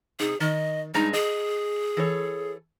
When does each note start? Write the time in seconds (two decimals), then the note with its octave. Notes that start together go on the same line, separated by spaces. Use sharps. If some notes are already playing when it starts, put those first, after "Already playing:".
0.20 C3 D#4 G#4
0.40 D#3 D#5
0.94 G2 G#3 D#4 A#5
1.13 G#4 D#5
1.97 E3 A4 C#5